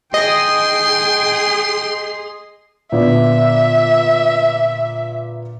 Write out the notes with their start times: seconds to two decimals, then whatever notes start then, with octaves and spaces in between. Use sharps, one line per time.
0.14 G#4 D#5 G5 C6
2.92 A#2 D3 B3 E5